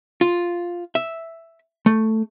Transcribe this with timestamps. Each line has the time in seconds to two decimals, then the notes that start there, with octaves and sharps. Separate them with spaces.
0.21 F4
0.95 E5
1.86 A3